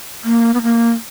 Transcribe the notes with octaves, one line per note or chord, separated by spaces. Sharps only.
A#3
B3
A#3